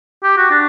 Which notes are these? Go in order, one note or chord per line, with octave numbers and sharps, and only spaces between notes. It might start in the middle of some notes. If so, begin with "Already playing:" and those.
G4
F#4
D4